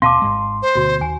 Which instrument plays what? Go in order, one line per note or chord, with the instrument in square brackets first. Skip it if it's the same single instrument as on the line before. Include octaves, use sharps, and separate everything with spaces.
[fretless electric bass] D#2 B2 C4 [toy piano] F5 A5 D6 [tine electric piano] C6
[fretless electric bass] G#1 G#2 G#3
[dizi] C5
[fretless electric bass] D2 B2 [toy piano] F#4
[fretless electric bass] D#2 [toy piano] G#5